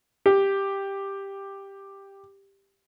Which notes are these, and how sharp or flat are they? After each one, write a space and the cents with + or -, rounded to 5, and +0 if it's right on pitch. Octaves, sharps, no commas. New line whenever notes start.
G4 +5